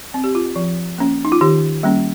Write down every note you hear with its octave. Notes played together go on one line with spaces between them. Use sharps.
C4
G4
F4
F3
A#3 C#4
D#4
F4
D#3 G4
G3 A#3 C#4